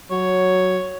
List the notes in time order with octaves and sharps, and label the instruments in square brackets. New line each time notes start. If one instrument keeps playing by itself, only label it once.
[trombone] F#3 [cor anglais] C#5